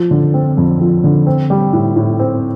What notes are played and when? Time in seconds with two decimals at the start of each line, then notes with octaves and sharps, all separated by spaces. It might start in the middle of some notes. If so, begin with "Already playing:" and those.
Already playing: F3
0.11 D3
0.34 C4
0.57 F2
0.81 F3
1.04 D3
1.27 C4
1.50 G3
1.73 A2
1.96 A2
2.19 C4